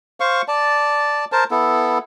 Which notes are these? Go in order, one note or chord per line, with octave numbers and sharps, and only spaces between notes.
C5 F5 C#6
D5 A5
A#4 C5 A5
B3 E4 A4